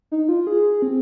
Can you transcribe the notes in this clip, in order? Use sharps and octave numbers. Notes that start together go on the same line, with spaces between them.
D#4
F4
G#4
C4